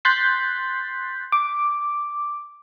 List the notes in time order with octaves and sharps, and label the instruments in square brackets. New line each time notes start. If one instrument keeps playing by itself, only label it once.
[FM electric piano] C6 F#6 G6 A6 B6 C7
D6